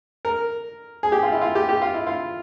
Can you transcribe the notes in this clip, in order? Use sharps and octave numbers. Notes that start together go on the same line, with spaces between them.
A#4
G#4
G4
F4
E4
F4
G4
G4
F4
E4
F4